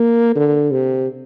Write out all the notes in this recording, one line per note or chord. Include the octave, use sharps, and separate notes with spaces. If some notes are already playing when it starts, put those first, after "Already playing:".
Already playing: A#3
D3
C3